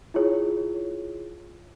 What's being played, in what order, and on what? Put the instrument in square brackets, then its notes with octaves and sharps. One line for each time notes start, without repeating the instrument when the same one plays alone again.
[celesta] E4 F4 G#4 C#5